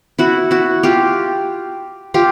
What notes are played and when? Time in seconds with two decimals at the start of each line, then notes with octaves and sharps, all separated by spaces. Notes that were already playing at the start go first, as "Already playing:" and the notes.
0.19 E4 F#4
0.51 E4 F#4
0.83 F4 G4
2.14 F4 G4